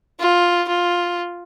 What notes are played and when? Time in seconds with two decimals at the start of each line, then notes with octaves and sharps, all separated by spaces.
0.20 F4
0.68 F4